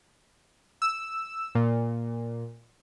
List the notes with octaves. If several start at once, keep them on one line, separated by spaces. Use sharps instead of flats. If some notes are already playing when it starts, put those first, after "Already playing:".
E6
A#2